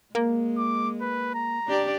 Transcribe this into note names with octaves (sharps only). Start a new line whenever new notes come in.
G#3 A#3
D6
B4
A#5
D4 G4 D5